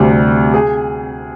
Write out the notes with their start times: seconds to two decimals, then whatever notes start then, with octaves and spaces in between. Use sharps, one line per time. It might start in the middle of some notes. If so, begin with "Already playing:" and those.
Already playing: D2 C3 G3
0.54 G#4